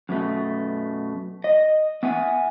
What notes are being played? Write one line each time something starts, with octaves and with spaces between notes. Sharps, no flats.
F#2 B2 A3
D#5
B3 E5 F#5 G#5